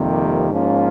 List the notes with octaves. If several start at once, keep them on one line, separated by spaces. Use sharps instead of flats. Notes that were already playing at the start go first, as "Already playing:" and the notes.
Already playing: F2 C3 D#3 G3 A#3
G#2 F3 A#3 C#4 F4